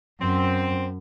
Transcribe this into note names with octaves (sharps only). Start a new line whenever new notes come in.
F#2 C4